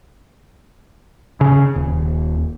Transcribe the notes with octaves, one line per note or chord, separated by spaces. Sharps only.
C#3
D#1